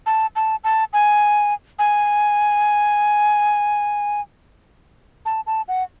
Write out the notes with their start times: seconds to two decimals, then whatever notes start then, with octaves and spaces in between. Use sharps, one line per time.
0.06 A5
0.36 A5
0.64 A5
0.93 G#5
1.79 G#5
5.26 A5
5.47 A5
5.68 F#5